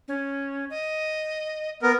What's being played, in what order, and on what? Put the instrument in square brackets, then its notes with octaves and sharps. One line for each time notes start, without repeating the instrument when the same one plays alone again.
[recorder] C#4
D#5
[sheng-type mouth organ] B3 A#4